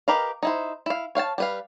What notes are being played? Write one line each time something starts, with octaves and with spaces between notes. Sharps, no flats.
G4 A#4 B4 D#5 F5
D#4 E4 C5
E4 F5
C#5 F5 F#5 A5
G3 B4 F5